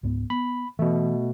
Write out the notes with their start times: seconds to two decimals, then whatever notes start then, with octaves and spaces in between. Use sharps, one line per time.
0.03 C#2 G#2 B3
0.30 B3 B5
0.79 B2 E3 A3